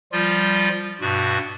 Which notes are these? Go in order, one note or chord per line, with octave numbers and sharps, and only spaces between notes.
F3 G3 F4
G2 B2 F#4